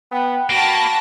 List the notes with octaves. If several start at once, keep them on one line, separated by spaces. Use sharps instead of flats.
B3 G5
A#3 F#4 G5 A5 B5 A#6